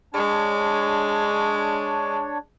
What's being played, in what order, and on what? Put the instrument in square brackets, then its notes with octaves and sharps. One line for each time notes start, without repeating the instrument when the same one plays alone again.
[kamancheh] G#3 [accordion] D4 C#5